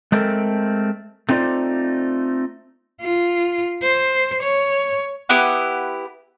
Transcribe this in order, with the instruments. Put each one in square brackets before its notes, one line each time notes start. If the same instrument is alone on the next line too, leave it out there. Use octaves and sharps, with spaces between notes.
[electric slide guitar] G#3 A3 C4 A4 A#4
A3 C4 D#4 F4 C5 D5
[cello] F4
C5
C#5
[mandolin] B3 E4 G4 F#5